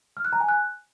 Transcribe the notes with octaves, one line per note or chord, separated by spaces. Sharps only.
F6
F#6
A#5
G#5
F#6